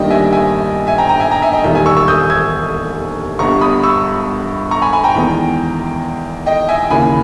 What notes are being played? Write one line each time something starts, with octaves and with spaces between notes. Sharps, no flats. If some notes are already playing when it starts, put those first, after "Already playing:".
Already playing: G1 G2 D#3 G3 A#3 D#5 G5
E5 G#5
E5 G#5
E5 G#5
G5 A#5
G5 A#5
E5 G#5
G5 A#5
E5 G#5
D#5 G5
E1 D#2 D#3 G3 E5
E5 G#5
C#6 E6
C#6 E6
D#6 G6
E6 G#6
G1 G2 G3 B3 A#5 C#6
B5 D#6
C#6 E6
A#5 C#6
G#5 B5
G#5 B5
G5 A#5
E2 D#3 G#3 B3
D#5 G5
E5 G#5
D#2 C#3 E3 A#3 G#5 B5